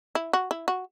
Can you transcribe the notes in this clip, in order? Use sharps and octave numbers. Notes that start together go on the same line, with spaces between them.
E4
F#4
E4
F#4